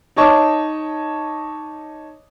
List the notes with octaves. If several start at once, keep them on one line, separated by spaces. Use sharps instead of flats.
D#4 C#5 D#5 A5 D6 D#6